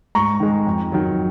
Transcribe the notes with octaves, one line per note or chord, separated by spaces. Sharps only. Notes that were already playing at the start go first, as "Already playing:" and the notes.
G#2 A#5 C#6
D#3 G#3
F2
D#3 F#3